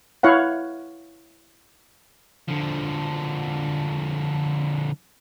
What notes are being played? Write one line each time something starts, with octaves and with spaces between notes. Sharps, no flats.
E4 C#5 F5 F#5
D3 F3